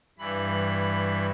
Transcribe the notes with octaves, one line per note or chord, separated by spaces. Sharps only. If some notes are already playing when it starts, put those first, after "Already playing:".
G2 E3 B5